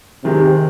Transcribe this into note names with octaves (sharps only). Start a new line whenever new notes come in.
C3 D#3 G#3 C4